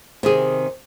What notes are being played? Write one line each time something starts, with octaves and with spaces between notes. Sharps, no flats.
C3 D#3 G#4